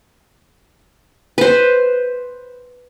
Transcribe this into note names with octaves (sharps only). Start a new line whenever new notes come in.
B4 C5